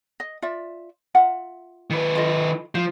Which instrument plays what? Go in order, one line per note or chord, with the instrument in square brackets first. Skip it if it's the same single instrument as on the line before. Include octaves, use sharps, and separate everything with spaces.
[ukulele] D#5
F4 D5 E5
F4 E5 F#5
[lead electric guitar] D#3 B4
[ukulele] F4 A4 D#5
[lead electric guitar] F3 [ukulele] C5